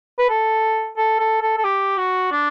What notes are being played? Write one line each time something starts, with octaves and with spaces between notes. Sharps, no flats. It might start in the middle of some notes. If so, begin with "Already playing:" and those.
B4
A4
A4
A4
A4
A4
G4
F#4
D4